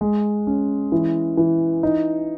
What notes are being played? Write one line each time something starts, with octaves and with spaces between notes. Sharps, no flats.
G#3
C#4
E3
E3
D#4